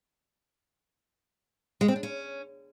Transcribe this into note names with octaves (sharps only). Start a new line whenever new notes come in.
G#3
C4
D4
C#4